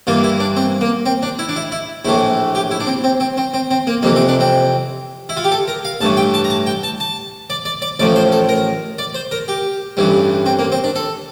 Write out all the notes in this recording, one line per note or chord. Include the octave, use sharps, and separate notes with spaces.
G2 E3 A#3 F4
E4
D4
C4
A#3
C4
D4
E4
D4
E4
E4
A#1 A2 E3 A3 E4
G4
E4
D4
C4
C4
C4
C4
C4
C4
A#3
F2 C3 E3 A#3
C4
D4
C4
E4
F4
G4
A4
A#4
F5
A1 G2 E3 A3 A5
G5
A5
A#5
A5
G5
A5
A5
D5
D5
D5
A1 A2 F3 D5
C5
A4
A#4
D5
C5
A#4
G4
A1 G2 E3 G3
C4
A#3
C4
D4
A4